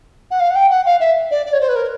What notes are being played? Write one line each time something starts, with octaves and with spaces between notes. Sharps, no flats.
F#5
F5
F#5
G5
F#5
F5
E5
D5
D5
C#5
C5
B4
A#4